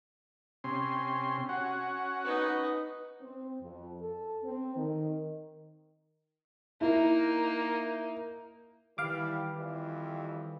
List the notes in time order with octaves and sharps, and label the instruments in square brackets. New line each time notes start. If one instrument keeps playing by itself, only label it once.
[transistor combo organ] C3 C#4 C6
C#4 F#4 F#5
[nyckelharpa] D#4 B4
[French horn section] C4
F2
A4
C4
D#3
[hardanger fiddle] A#3 D#4 [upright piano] E4
[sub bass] D#3 [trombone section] E3 G3 [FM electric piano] F5 D6
[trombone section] F2 E3 G3